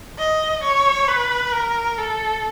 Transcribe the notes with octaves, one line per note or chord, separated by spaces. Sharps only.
D#5
C#5
B4
A#4
A4